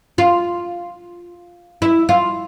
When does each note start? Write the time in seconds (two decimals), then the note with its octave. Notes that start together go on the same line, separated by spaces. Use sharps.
0.18 F4
1.82 E4
2.09 F4